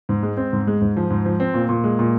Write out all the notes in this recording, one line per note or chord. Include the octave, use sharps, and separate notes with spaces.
G#2
G#3
C4
G#2
G#3
G#2
F3
G#2
F3
C4
A#2
A#2
G#3
A#2